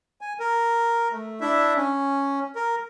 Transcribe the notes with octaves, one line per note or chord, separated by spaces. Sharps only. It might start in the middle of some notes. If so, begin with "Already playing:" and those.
G#5
A#4
A3
D4 E4 E5
C#4
A#4